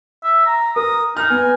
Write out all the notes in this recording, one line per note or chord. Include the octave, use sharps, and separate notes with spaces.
E5
A#5
A#4 D#6
D#4 F6
B3 G#5